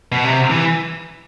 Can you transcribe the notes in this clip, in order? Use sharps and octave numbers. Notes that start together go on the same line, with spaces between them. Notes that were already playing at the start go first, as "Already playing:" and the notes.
B2
C3
E3